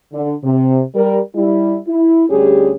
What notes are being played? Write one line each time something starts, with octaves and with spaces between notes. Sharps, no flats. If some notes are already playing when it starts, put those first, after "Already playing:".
D3
C3
G3 A#4
G3 E4
E4
D2 G3 C#4 G4 G#4